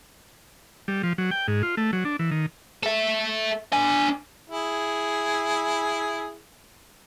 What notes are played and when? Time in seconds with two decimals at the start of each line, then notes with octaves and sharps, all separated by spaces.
0.88 G3
1.03 F3
1.18 F#3
1.31 G5
1.48 G#2
1.63 F4
1.77 A3
1.93 F#3
2.05 D4
2.19 E3
2.31 D#3
2.83 A4 E5
3.73 D4 G#5
4.50 E4 G#4